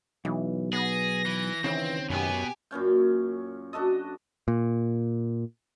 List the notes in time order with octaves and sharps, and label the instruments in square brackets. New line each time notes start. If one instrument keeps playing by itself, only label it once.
[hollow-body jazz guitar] B1 [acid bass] E3
[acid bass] B3 [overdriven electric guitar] G#4 [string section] A#6
[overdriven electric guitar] E3
[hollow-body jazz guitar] D#2 C#3 [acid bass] E3 [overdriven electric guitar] C4
[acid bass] F#2 [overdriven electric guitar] B2 B3 [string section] G4 G#5
[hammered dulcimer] F#2 A#2 C#4 G5
D4 F#4 A4 D#5
[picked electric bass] A#2